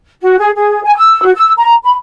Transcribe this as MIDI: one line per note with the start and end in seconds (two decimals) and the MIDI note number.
0.22 0.38 66
0.38 0.50 68
0.55 0.81 68
0.82 0.96 80
0.97 1.21 88
1.23 1.31 66
1.34 1.51 88
1.57 1.73 82
1.83 1.94 83